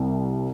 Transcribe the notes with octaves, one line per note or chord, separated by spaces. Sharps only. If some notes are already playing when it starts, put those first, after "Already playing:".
Already playing: C2 C3